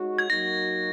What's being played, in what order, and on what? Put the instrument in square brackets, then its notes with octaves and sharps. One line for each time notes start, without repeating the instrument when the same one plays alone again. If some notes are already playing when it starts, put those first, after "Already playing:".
Already playing: [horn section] G#3 D#4 F#4 C#5
[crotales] G#6
[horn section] F#3 A#3 D#4 F#4 [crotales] A#6